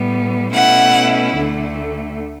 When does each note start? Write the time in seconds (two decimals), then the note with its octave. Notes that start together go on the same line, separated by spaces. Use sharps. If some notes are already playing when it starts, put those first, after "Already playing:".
Already playing: A2 G3 B3
0.53 B2 A3 C#4 E4 F#5
1.37 D2 D3 A3